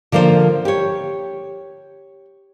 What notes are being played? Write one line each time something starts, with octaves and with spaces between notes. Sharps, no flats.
D3 F3 A#3 D4 C5
G4 C#5